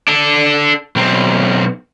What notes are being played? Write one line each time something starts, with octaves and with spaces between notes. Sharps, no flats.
D4 A4
B1 C4